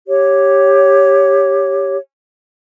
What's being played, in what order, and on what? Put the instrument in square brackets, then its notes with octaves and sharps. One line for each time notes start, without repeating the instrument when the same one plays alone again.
[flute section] G4 C#5